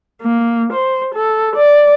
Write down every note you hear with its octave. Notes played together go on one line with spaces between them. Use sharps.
A#3
C5
A4
D5